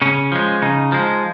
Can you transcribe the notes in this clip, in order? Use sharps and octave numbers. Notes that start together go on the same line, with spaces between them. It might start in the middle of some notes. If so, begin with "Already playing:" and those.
C#3 C#4
F3 G#3
C#3 D#4
F3 G#3